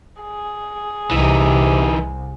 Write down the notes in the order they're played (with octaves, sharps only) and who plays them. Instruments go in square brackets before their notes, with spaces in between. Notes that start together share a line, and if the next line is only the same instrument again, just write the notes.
[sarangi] G#4
[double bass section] C2 [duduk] C3 [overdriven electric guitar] E3 D#4